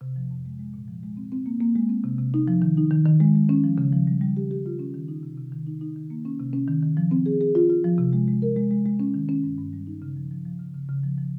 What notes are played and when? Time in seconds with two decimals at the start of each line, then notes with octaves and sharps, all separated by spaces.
0.01 C3
0.16 F3
0.31 F2
0.45 G#3
0.59 G#3
0.74 A#2
0.88 F3
1.03 G#3
1.17 C4
1.32 C4
1.46 A#3
1.61 A#3
1.75 G#3
1.89 C4
2.04 C3
2.18 C3
2.34 D#4
2.48 F3
2.62 D#3
2.77 D#4
2.91 D#3
3.06 D#3
3.20 G#3
3.35 G#3
3.49 C#4
3.64 F3
3.78 C#3
3.93 F3
4.07 G3
4.21 G3
4.37 G4
4.51 G4
4.66 F4
4.79 C#4
4.94 D#3
5.08 D#4
5.23 C3
5.38 C3
5.52 D#3
5.67 D#4
5.81 D#4
5.96 D#3
6.10 A#3
6.25 C#4
6.40 C3
6.53 C#4
6.68 D#3
6.83 D#3
6.97 F3
7.11 C4
7.26 G#4
7.41 G#4
7.55 F4
7.69 F4
7.84 F3
7.98 C3
8.13 G#3
8.28 G#3
8.42 A#4
8.56 G#3
8.71 G#3
8.86 G#3
9.00 C#4
9.14 D#3
9.29 C#4
9.44 G2
9.58 G2
9.73 G3
9.87 D#4
10.02 C#3
10.17 F3
10.31 F3
10.46 F3
10.59 C#3
10.74 C#3
10.89 C#3
11.03 F3
11.18 F3